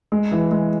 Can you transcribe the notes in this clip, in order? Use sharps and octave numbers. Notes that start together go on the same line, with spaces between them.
G#3
E3
G#3